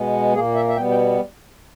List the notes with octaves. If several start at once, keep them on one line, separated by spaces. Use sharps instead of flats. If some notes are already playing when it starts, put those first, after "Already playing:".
Already playing: B2 G#3 B3
A#2 A#3 G#4
E5
E5
B2 G3 B3 G5
G5